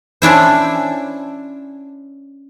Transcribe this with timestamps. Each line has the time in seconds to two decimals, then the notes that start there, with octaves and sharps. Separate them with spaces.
0.22 C#4 D4 E4 C5